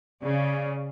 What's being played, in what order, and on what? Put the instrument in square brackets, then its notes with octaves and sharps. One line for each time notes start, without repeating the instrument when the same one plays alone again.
[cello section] C#3 [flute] D5